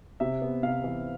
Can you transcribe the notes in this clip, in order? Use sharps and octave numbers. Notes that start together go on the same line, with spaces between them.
C3 E5
B3
C3 F5
E3